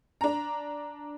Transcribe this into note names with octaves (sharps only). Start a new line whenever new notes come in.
D4 A#5